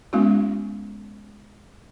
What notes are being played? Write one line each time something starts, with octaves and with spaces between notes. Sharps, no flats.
G#3 A#3 B3 C#4 E4 F#4